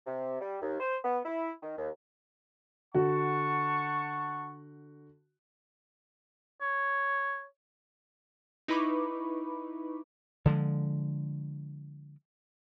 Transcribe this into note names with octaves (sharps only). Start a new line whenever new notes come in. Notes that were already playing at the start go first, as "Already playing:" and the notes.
C3
G3
D#2
C5
B3
E4
D#3
D#2
D3 F#4 F#5 A5 C#6
C#5
D#4 E4 B4 B5 C#6 D6
D3 F3 G#3